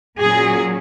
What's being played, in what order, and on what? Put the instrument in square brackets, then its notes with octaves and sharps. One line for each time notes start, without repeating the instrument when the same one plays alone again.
[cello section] A#2 F#3 C#4 G#4